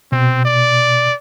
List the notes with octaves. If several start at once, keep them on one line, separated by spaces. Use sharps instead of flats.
B2 C4
D5